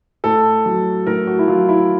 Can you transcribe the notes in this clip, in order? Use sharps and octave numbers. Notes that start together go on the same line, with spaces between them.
A2 A4
F#3
A2 A#4
F#4
E4
F#3 F4
E4